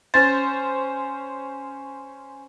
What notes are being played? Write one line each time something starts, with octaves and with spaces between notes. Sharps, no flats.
C#4 C5 A6